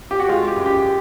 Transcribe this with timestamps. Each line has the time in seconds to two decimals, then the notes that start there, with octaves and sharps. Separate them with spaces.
0.11 G4
0.20 F#4
0.29 G#3 F4
0.47 G4
0.56 F#2
0.66 G4